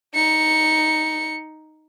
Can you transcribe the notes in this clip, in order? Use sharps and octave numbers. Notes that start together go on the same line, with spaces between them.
D#4 C#7